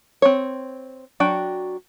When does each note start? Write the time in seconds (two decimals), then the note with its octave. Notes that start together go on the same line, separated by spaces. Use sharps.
0.22 C4 C#5
1.20 F#3 D4 F#4 G5